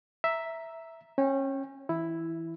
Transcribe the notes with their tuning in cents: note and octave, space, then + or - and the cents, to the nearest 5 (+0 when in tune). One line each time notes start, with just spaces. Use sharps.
E5 +0 A#5 +0
C#4 -25 G5 +0
E3 -10 E4 +0